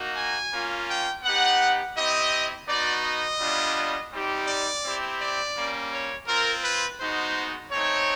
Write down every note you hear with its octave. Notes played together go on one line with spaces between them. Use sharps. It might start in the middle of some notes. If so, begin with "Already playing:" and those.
Already playing: A#3 D#4 F#4
G#5
A#3 C#4 F4
G5
B3 D#4 G4 F#5
C4 E4 G4 D#5
B3 D#4 F#4 D5
D#5
G3 B3 D4 F4
G3 C4 D#4 G4
D5
C4 E4 G4
D5
G3 A#3 C#4
C#5
C4 F4 A#4
B4
G#3 B3 D#4 F#4 C5
A3 C4 D#4 C#5